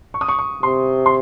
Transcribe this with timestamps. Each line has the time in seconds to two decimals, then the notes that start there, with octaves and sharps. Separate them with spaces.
0.14 C#6
0.21 D#6
0.28 C#6
0.39 C#6
0.63 C3 C6
1.06 C6